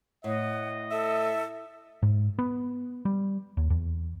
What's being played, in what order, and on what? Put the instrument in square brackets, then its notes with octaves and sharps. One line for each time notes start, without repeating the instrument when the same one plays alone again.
[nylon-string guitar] A2 [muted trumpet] D#5 [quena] F#5
[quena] A4 [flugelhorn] E5
[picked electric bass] G#2
B3
G3
D#2
E2